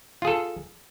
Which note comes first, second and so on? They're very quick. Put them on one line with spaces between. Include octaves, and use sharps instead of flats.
F4 G#4 A4